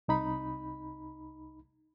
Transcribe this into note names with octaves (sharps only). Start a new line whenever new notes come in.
C2 D#4 B5